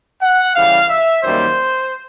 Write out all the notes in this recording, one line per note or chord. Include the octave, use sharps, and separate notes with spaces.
F#5
C#3 E3 G3 F5
E5
F#2 D#3 G3 A#3 C5